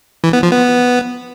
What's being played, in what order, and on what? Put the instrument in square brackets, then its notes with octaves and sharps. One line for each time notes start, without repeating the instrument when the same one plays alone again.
[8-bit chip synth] E3
B3
F3
B3